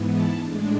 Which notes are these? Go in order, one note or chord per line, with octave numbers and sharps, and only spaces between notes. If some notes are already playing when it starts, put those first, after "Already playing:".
Already playing: G#2 E3 B3
A5
A2 G#3 D4